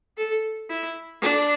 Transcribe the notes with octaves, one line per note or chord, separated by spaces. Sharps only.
A4
E4
D4